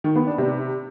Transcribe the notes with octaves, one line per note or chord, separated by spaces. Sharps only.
D#3
B3
D4
C3